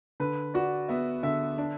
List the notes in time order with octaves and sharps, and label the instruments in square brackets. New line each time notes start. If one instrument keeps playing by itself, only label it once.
[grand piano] D3 [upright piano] B4
[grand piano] F#4 [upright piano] D5
[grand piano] B3 [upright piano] E5
[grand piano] D3 [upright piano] E5
[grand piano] D4